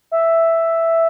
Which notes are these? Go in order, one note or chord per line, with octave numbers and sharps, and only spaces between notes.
E5